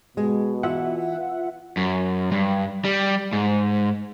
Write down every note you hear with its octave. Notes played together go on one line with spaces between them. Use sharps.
B2 G#3
E3 F4 E5 F#5
F#2
G2
G3
G#2